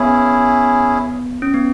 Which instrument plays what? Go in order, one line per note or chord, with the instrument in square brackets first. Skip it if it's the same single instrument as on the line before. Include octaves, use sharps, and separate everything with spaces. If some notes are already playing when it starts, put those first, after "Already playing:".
Already playing: [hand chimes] B3 [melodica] C#4 E4 G#4
[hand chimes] C#4
B3